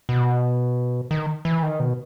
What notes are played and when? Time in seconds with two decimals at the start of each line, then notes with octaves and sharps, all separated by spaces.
0.09 B2
1.11 D#3
1.45 E3
1.63 D#3
1.80 B2